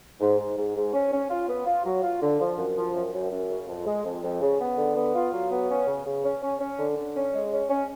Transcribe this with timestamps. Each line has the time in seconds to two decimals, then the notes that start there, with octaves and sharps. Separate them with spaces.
0.20 G#2
0.39 G#2
0.57 G#2
0.76 G#2
0.93 C#4
1.12 C#4
1.29 F4
1.49 B3
1.66 F4
1.85 F#3
2.03 F4
2.22 D3
2.40 F3
2.57 F#2
2.77 F3
2.94 F#2
3.12 F#2
3.31 F#2
3.50 C#3
3.68 F2
3.86 G#3
4.05 F2
4.23 F2
4.41 C#3
4.59 B3
4.77 D3
4.95 B3
5.15 F4
5.33 F#3
5.51 B3
5.69 C#4
5.86 C#3
6.06 C#3
6.23 C#4
6.42 C#4
6.60 C#4
6.78 D3
6.97 D3
7.15 C#4
7.34 G#3
7.52 C#4
7.70 C#4